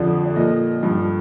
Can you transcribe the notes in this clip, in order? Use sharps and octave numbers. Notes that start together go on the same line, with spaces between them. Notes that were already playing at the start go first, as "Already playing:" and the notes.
Already playing: F2 D3 F3 D5
D5
A#2 F3 D#5
G2 F3